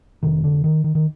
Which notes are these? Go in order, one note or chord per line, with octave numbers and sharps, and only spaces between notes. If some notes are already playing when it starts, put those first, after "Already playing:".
F1 F2 C3 D#3
D3
D#3
D#3
D#3